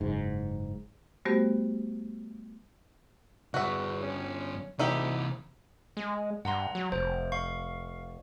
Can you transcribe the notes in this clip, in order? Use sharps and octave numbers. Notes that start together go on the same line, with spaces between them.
F#1 G#2
G3 A3 B3 F#4 G4 C5
E2 G2 D3 F#4 E5
C#4
D2 C3 E3 D#4 E4 G4
G#3
G2 F#5 A#5 C6
F#3
F1 C5
F5 C#6